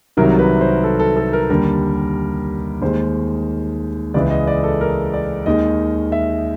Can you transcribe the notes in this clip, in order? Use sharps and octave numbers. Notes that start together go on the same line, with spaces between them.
C2 C3 D#3 F#3 A#4
B4
C5
A4
A4
A4
A#4
D#2 D3 G3 A#4
D#2 D#3 G#3 C5
C#2 C#3 E3 G#3 D5
D#5
D5
A4
A#4
D5
D#2 D#3 G#3 D#5
E5